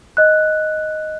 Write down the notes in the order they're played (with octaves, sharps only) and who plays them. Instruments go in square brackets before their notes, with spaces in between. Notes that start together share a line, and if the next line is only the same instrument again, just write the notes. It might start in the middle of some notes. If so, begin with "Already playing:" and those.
[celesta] D#5 F#6